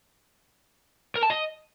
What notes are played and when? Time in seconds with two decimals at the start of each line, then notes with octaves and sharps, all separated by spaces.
1.16 A#4
1.23 A5
1.30 D#5